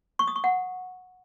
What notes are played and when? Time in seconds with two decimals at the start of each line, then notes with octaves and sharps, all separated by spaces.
0.19 C#6
0.27 D#6
0.36 C#6
0.44 F#5